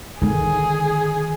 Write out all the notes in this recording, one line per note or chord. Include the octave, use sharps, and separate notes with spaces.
D3 D#3 G#4